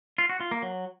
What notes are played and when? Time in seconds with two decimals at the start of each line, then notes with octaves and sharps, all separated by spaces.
0.18 F4
0.29 F#4
0.40 F4
0.51 A#3
0.62 F#3